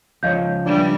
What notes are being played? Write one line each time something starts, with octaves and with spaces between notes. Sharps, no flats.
C#2 F3 C#5 D#5 F5 G6
E3 G3 D4